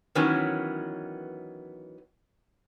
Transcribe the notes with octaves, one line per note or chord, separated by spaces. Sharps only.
D#3 E3 F#3 B3 C#4